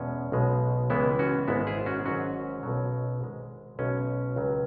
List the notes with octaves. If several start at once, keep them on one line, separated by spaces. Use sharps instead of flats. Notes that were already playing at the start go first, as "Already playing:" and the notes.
Already playing: E2 B2 G#3 C#4
B1 B2 G#3
C#2 C#3 E3 G#3 B3 E4
C#4 F#4
G#1 G#2 G#3 B3 E4
E4 G#4
C#4 F#4
G#1 G#2 F#3 C#4 F#4
B1 B2 F#3
G#1 G#2 G#3
B1 B2 G#3 C#4
C#2 C#3 F#3